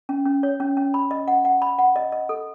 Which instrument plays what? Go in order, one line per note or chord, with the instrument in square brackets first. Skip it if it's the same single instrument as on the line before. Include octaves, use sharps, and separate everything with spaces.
[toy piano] C#4
C#4
C#5
C#4
C#4
B5
D#5
F#5
F#5
B5
F#5
D#5
D#5
A4